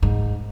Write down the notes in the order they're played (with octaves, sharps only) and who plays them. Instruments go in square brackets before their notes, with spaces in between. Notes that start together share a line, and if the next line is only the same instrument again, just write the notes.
[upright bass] G#2